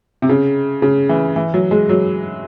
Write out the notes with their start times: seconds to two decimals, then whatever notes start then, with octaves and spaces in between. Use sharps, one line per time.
0.22 C3
0.29 C#3
0.82 C#3
1.09 E3
1.36 E3
1.54 F#3
1.71 G#3
1.89 F#3